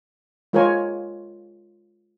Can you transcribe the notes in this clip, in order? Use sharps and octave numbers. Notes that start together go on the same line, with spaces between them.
G#3 F4 A#4 C5 C#5 G#5